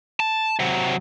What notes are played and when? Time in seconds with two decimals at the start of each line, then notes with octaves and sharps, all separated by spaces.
0.20 A5
0.59 C3 F#3